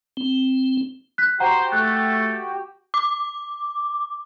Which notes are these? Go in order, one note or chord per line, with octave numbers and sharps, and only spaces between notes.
C4
F#6 B6
F#4 G4 C5 F#5 G5 A#5
A3 A4 F#6
D6